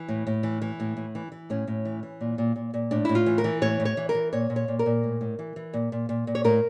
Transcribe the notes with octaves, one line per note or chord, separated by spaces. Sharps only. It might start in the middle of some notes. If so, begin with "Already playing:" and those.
Already playing: E3
A2
A2
E3
E3
A2
A2
E3
E3
A2 C#4
A2
E3
E3
A#2
A#2
A#2
A#2
A2 D4
A2 E4
F4
E3
A#4
E3
A2 C#5
A2
C#5
E3
A#4
E3
A#2 C#5
A#2
C#5
A#2
A#4
A#2
A2
A2
E3
E3
A#2
A#2
A#2
A#2
C#5
A2 A#4